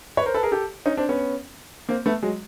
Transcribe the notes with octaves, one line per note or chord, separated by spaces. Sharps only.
B4 C#5
A#4 C5
A4 B4
G#4 A#4
G4 A4
C#4 D#4
C4 D4
B3 C#4
A#3 C4
A3 B3
F#3 G#3